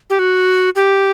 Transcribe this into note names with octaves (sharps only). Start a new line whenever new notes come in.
G4
F#4
G4